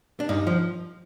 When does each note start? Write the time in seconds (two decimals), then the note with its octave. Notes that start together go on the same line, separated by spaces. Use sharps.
0.20 D4
0.29 G2 D#4
0.47 F3